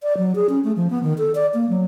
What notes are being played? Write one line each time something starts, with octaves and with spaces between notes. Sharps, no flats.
D5
F#3
G#4
C#4
A3
F3
B3
D#3
A4
D5
A#3
F#3